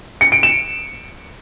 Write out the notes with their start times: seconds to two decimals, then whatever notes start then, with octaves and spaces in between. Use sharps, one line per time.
0.21 C#7
0.32 D7
0.43 E7